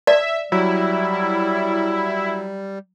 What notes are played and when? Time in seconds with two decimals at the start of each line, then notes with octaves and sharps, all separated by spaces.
0.07 D5 E5
0.52 F#3 G3 E4